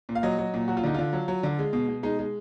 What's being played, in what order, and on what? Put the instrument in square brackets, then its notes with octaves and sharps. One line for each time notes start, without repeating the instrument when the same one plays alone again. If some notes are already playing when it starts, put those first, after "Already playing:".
[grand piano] A#2
F5
F#3 D#5
F#3
A#2
F#3 F#4
F4
D3 D#4
D3 F4
F#3
F#3
D3
G#3
B2
B2
G#3 D#4
G#3